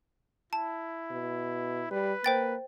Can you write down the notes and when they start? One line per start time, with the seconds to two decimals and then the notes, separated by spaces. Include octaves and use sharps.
0.53 E4 A5
1.11 B2
1.91 G3 B4
2.24 A#3 C5 G5 A6